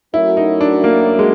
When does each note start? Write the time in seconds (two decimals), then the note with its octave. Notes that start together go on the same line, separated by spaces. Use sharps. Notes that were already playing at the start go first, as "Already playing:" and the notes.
0.14 F#3 A3 C#4 E4 F#4 A#4
0.37 D#4
0.61 D4
0.84 A#3
1.19 G#3